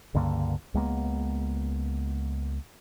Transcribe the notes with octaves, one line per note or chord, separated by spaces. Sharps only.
C#2 G2 D3 A#3
C#2 G#3 A#3 B3